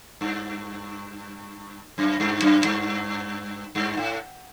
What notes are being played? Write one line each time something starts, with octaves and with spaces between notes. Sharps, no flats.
G2
F#2
G2
F#2
G2
G2
A2